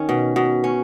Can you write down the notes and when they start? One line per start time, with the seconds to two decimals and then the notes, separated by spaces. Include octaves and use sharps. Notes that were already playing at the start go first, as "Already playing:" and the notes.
Already playing: D#3 C#4
0.09 B2
0.36 B2
0.64 C#4